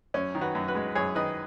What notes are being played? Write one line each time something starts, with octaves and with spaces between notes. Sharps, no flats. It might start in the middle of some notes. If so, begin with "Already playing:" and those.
F#2 C#4
D#3
F#4 B4
F#2
F#4 B4
G#3
F#2 G#4 C#5
D#3 B4 D#5